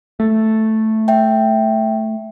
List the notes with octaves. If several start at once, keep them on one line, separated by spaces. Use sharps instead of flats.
A3
E5 G5